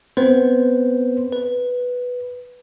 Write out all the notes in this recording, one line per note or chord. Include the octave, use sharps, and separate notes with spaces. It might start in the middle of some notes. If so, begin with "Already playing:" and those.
B3 C4 B4 C5
B4